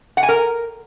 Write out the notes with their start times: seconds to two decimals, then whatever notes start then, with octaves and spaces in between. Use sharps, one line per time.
0.17 F#5
0.23 G#5
0.29 A#4